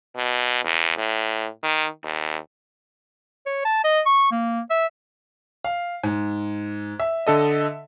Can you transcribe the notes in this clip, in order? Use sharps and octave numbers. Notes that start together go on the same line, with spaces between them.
B2
E2
A2
D#3
D#2
C#5
A5
D#5
C#6
A#3
E5
F5
G#2
E5
D3 A4 D#5